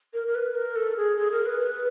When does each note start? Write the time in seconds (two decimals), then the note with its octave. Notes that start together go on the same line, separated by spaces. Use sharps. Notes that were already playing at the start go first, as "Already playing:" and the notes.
0.14 A#4
0.27 A#4
0.35 B4
0.51 B4
0.55 A#4
0.76 A4
0.97 G#4
1.18 G#4
1.31 A#4
1.46 B4
1.60 B4